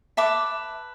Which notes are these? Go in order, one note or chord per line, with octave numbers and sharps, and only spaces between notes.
B4 E5 A5 D6